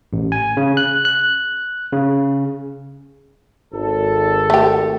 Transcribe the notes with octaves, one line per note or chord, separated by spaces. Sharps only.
A1
G#5
C#3
F#6
F#6
C#3
G#1 A4
A3 G4